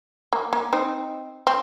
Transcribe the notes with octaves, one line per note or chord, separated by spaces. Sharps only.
A#3
A#3
C4 D#4
C4